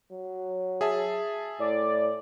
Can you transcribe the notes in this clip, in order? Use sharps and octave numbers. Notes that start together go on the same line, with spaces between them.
F#3
G#4 E5 A5
A2 D5